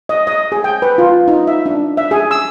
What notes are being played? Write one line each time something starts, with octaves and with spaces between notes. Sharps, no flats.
D#5
D#5
G#4
G5
B4
F4
D#4
E5
D4
E5
G#4
E6